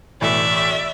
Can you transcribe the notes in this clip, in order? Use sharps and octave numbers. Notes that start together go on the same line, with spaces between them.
B1 A2 E3 D5 E5